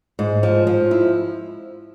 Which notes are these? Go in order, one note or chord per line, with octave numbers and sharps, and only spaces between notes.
G#2
F3
F3
E4